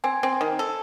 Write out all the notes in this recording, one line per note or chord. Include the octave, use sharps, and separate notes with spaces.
C4 G#5
C4
D#3
A4